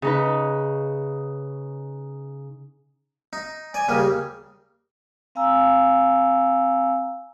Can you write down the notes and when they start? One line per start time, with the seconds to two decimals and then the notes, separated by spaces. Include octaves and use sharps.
0.02 C#3 D#4 B4
3.33 D#4
3.74 D5 G#5
3.88 D#2 C#3 G3 A#3
5.35 C4 F5 G#5 A#5 E6